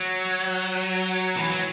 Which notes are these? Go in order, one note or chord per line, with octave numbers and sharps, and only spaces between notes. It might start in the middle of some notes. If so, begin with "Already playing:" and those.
Already playing: F#3
E3
F#3